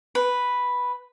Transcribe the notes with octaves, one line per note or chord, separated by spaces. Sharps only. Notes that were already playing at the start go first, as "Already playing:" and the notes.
B4